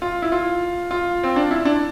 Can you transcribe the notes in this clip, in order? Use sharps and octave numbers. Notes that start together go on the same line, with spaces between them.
F4
E4
F4
F4
C4
D4
E4
D4